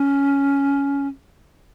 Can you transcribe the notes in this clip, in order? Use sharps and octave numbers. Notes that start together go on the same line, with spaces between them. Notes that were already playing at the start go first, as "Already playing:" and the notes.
Already playing: C#4